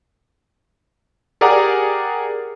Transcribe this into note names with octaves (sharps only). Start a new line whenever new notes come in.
G4 G#4 A#4 D5 F#5 A#5